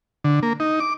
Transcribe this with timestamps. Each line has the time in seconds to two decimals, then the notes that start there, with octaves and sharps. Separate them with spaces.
0.24 D3
0.43 A#3
0.60 D#4
0.80 D6